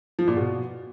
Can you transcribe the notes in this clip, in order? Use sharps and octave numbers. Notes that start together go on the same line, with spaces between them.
F3
A#2
B2